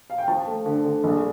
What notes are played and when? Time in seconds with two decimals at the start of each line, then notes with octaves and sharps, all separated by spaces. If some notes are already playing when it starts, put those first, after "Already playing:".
0.10 F5
0.18 G5
0.28 F3 A5
0.46 A3
0.66 D3
0.85 D3
1.04 A#1